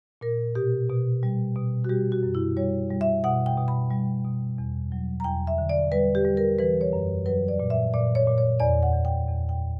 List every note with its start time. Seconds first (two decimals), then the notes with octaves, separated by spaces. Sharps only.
0.21 A#2 A#4
0.55 B2 G4
0.90 B2
1.23 G3
1.56 B2
1.84 F#4
1.89 G3 G4
2.12 F#4
2.23 F#2
2.35 E4
2.57 G3 C#5
2.90 G3
3.01 E5
3.24 B2 F#5
3.46 G5
3.57 B2
3.68 B5
3.90 G3
4.24 B2
4.58 E2
4.92 F#3
5.20 A#5
5.24 E2 G5
5.47 E5
5.58 D3
5.69 D5
5.92 G3 B4
6.15 G4
6.25 G3
6.37 A#4
6.59 E3 B4
6.81 C#5
6.93 F#2
7.26 F#3 B4
7.48 D5
7.60 A#2
7.70 E5
7.94 A#2 D5
8.15 C#5
8.27 A#2
8.38 C#5
8.60 E2 D5
8.83 F#5
8.94 E2
9.05 G5
9.28 E2
9.49 G5